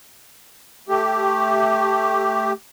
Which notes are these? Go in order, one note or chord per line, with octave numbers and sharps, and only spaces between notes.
A3 G4